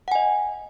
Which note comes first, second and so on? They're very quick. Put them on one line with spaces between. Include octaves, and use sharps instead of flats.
F#5 G#5 D#5